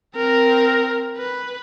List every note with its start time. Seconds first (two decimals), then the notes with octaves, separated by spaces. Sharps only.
0.16 C4 A#4
1.17 B4